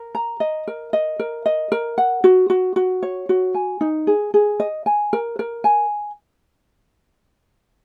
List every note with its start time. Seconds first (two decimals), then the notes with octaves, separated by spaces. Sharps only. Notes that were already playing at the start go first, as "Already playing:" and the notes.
Already playing: A#4
0.15 A#5
0.40 D#5
0.67 A#4
0.93 D#5
1.20 A#4
1.46 D#5
1.72 A#4
1.98 F#5
2.24 F#4
2.50 F#4
2.76 F#4
3.03 C#5
3.29 F#4
3.55 G#5
3.81 D#4
4.07 G#4
4.34 G#4
4.60 D#5
4.86 G#5
5.13 A#4
5.39 A#4
5.64 G#5